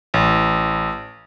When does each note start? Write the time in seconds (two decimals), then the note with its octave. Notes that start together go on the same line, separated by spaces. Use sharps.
0.14 A1